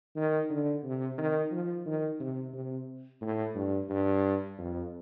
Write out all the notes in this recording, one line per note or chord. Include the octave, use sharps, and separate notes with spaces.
D#3
D3
C3
D#3
F3
D#3
C3
C3
A2
G2
G2
F2